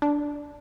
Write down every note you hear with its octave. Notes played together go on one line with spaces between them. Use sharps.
D4